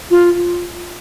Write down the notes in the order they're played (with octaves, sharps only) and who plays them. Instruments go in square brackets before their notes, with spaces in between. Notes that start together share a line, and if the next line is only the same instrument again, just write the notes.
[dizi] F4